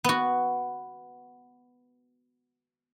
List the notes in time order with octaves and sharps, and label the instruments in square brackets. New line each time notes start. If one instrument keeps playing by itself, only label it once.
[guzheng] B3 F#4